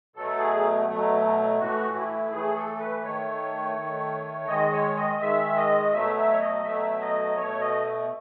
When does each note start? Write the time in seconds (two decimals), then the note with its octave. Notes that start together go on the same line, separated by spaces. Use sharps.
0.16 B2 F#3 A3 A4
0.39 G#4
0.87 B2 F#3 A3
1.59 A2 E3 A3 F#4
1.96 E4
2.31 A2 E3 A3 G#4
2.56 A4
2.79 B4
3.04 D#3 A3 C#5
3.76 D#3 A3
4.48 D#3 G#3 D#5
4.72 C#5
4.96 D#5
5.20 D#3 G#3 E5
5.56 D#5
5.92 B2 F#3 A3 E5
6.16 E5
6.32 C#5
6.40 D#5
6.64 B2 F#3 A3 E5
7.00 D#5
7.37 B2 A3 C#5
7.60 D#5